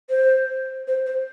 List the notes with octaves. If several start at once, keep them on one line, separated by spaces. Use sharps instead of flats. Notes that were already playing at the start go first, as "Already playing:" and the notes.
C5
C5
C5